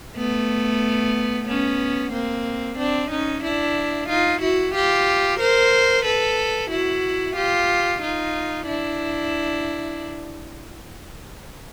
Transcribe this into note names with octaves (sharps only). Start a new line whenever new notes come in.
A3 B3
B3 C#4
A#3 C4
C4 D4
C#4 D#4
D4 E4
D#4 F4
E4 F#4
F4 G4
A#4 C5
A4 B4
E4 F#4
F4 G4
D#4 F4
D4 E4